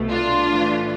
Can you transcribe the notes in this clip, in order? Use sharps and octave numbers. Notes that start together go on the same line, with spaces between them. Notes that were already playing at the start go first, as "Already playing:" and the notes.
Already playing: C2 B2 A3
D4 F4
A2 E3 A3